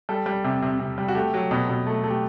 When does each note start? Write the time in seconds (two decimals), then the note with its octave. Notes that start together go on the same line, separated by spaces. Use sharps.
0.09 G3 A4
0.26 G3
0.44 C3
0.62 C3
0.79 C3
0.98 G3
1.08 F#4
1.15 A3 G4
1.34 F#3
1.51 B2
1.69 B2
1.87 A3
2.04 A3
2.10 G4